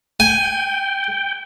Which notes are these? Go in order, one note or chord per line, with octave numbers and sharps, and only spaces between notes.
G5 G#5